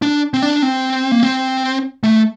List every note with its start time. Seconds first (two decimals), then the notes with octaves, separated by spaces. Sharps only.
0.02 D4
0.34 C4
0.42 D4
0.62 C4
1.12 A#3
1.23 C4
2.03 A3